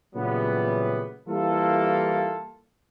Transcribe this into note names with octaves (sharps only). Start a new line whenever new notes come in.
A#2 C#3 E3 F#3 G3 B3
E3 G3 A#3 E4 F4 A4